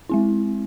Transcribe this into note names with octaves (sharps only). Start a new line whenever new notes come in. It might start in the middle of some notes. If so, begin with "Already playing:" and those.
G#3 C4 E4